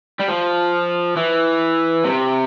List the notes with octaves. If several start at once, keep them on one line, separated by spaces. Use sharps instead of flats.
G3
F3
E3
C3